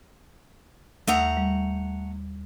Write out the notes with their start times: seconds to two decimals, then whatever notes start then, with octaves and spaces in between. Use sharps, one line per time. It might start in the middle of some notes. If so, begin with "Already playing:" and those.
1.07 D#2 A3 F#5 A#5 D#6 E6
1.37 G3